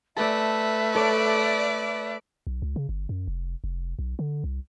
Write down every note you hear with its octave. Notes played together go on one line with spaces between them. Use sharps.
A3 B4 D5 E5 A5
A4 C#5 D5 D6
B1
C#2
C#3
G1
F#2
F1
F1
B1
D3
C2